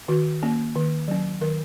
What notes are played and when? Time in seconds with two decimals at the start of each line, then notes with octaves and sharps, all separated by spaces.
0.08 D#3 F#4
0.42 A#3 C#4
0.75 D#3
1.08 F#3 C#4
1.41 D#3 A#4